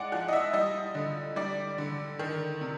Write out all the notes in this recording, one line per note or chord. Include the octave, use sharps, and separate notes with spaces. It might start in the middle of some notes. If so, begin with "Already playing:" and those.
Already playing: G#3 D5 F#5
F3 F#5
D#5
E5
G3 D#5
D3
G3 D5
D3
D#3
C3